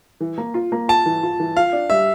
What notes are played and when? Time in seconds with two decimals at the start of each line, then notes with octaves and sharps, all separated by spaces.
0.20 E3
0.38 A#3
0.54 F4
0.72 A#3
0.88 F4 A5
1.06 E3
1.23 F4
1.40 E3
1.56 F4 F5
1.73 D4
1.90 G3 E5